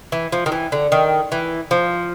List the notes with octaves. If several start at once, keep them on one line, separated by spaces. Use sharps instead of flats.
E3
F3
D#3
E3
D3
D#3
E3
F3